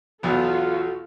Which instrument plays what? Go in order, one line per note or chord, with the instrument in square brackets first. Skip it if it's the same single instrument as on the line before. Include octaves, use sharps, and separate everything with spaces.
[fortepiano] B1 E2 B3 [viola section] F4 A4 [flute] F#4